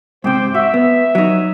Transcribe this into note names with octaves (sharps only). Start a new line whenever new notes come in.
G#2 C3 G4 C5 G5
F#4 E5
B3
F#3 D#4